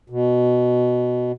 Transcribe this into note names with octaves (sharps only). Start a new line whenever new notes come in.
B2